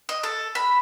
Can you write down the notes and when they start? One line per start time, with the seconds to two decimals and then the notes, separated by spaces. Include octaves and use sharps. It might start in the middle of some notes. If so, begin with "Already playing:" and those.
0.09 D#5
0.23 A4
0.55 B5